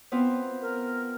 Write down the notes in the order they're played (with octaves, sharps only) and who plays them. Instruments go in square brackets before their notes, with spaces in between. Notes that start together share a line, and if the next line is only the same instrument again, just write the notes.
[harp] B3 C4 F4
[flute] A#4